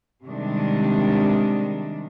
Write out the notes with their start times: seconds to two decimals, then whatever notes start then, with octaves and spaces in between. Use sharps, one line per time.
0.25 C3 D#3 G3 G#3 D4